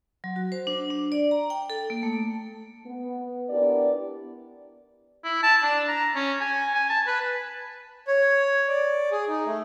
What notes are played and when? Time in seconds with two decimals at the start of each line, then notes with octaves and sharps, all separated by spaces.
0.24 F#3
0.36 F#4
0.52 C5
0.67 D4
0.90 D4
1.12 D5
1.31 A#5
1.50 G5
1.70 A4
1.90 A#3
2.03 A3
2.86 B3
3.50 B3 D4 E4 G4 A#4 D5
5.24 E4
5.43 A5
5.63 D4
5.88 A#5
6.15 C#4
6.41 G#5
6.75 G#5
6.89 A5
7.07 B4
8.08 C#5
8.68 D5
9.12 G#4
9.28 D#4
9.46 A3